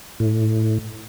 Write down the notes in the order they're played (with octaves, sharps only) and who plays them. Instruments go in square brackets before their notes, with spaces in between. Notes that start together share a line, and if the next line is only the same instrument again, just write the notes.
[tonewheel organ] A2